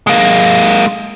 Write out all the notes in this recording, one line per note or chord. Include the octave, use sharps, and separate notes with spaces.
G#3 A#3